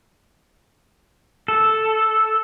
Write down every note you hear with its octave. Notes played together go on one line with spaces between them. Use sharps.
A4